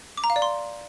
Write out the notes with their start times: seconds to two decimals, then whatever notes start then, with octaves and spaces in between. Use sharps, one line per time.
0.17 D6
0.24 A#5
0.30 F5
0.36 D5
0.42 C6